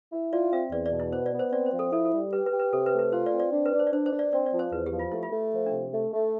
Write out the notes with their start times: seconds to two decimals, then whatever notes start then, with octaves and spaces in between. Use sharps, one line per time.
0.12 E4
0.32 F4 D5
0.52 C4 E5
0.72 E2 D5
0.86 D5
0.92 B2
1.00 E4
1.12 B3 C5
1.26 D5
1.33 B3
1.39 C5
1.52 C4 D5
1.66 C5
1.73 F3
1.79 A4
1.93 E4 A4
2.05 A4
2.12 G3
2.33 G4 B4
2.46 B4
2.52 G4
2.59 B4
2.72 C3 A4
2.86 B4
2.93 A3
2.99 B4
3.12 F4 C5
3.26 D5
3.32 C4
3.40 D5
3.52 D4
3.66 B4
3.73 D4
3.79 C5
3.87 D5
3.93 D4 C5
4.06 C5
4.13 D4
4.19 D5
4.32 C4 D5
4.46 D5
4.53 F3
4.59 C5
4.72 E2 B4
4.86 G4
4.93 F3
4.99 F4
5.11 A3 E4
5.23 F4
5.33 A3
5.53 F3
5.66 D4
5.73 C3
5.93 A3
6.13 A3